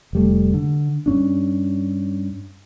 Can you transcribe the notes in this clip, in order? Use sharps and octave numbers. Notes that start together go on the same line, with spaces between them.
F1 G3 A3
D3
G2 C#4 D4